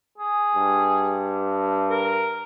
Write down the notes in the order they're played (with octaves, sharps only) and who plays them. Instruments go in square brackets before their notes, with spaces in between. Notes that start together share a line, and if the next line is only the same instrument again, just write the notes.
[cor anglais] G#4
[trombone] G2
[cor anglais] A#4